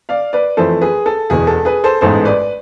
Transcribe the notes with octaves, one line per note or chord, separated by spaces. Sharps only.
D5 F5
B4 D5
F2 E3 A3 A4 C5
G#4 B4
A4
E1 E2 B2 G#4
A4
G#4 B4
A4 C5
A1 G#2 G#3 B3 A4 C5
B4 D5